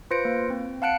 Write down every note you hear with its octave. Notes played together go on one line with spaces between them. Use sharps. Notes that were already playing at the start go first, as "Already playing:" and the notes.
F4 B4 C5 A#6 C#7 D7
A#3
C4
F5 F#5 A5 F#6 C#7 D7